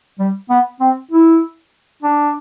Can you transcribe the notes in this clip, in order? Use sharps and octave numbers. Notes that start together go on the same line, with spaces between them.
G3
B3
C4
E4
D4